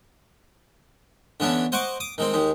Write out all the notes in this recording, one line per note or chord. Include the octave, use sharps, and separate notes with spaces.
D3 E3 B3 C#4 D4
C5 D#5 F#5 A#5 C#6 D6
D6 D#6
D#3 G#3 C4
D#2 D#3 G#3